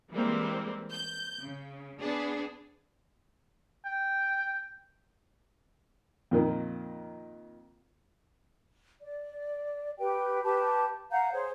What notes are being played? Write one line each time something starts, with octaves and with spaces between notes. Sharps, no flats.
E3 G3 G#3 A#3 C4
G6
C#3
B3 D4 G#4
G5
F2 A#2 D#3
D5
G4 B4 G5
G4 B4 A5
F5 F#5 A#5 G6
G#4 C5 C#5